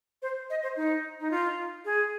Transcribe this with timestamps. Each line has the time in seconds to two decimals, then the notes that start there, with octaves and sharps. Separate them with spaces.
0.22 C5
0.50 D#5
0.63 C5
0.77 D#4
1.20 D#4
1.31 F4
1.85 G#4